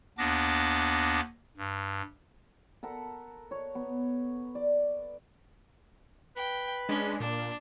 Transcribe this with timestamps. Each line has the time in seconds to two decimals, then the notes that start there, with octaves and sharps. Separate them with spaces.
0.18 D#2 B3 D4 D6 A#6
1.57 G2
2.83 A4 A#4 F#5 B5
3.51 C#5
3.75 B3
4.55 D5
6.36 B4 G5
6.89 G#3 C#4 D4
7.20 A#2 D4